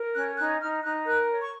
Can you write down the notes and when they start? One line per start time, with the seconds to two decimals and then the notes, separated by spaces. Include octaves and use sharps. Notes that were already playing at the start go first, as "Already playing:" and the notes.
Already playing: A#4
0.15 C#4 F#6
0.38 D#4 F#6
0.61 D#4 F6
0.84 D#4 F#6
1.07 A#4 F#6
1.30 C#5
1.41 C#6